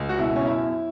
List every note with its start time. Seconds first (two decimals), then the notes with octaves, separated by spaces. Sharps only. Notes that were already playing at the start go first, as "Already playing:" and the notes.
Already playing: C#2
0.09 F#4
0.18 B2 E4
0.36 C#4
0.46 F#2 E4